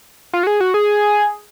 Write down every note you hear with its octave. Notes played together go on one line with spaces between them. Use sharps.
F4
F#4
G#4
F#4
G#4